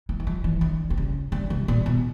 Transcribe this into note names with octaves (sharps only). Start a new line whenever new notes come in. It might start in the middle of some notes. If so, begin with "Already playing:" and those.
E3
E3
F3
E3
D3
C3
C#3
D3
C3
A#2
B2